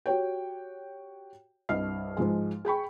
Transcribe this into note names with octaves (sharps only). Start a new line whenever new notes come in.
F#4 G4 C#5 G5
C2 G2 D#5 F6 C7
G#2 F3 G#3
G#4 G5 B5 C#6